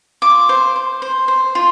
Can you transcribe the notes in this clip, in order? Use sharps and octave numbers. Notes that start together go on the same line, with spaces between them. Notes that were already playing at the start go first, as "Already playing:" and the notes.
F4 D6
C5
C5
C5
C5
F4